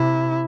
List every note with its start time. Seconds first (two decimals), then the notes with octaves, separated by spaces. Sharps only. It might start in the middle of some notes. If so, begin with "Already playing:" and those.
Already playing: C3 E4